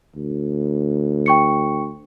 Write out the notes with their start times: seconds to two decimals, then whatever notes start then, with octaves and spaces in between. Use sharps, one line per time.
0.16 D2
1.26 G5 C#6 C#7